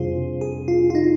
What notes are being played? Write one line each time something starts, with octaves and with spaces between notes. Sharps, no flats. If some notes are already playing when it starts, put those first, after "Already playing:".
Already playing: F2 C3 G3 D4 F4 G#4 C5
G#4
F4
F4
D#4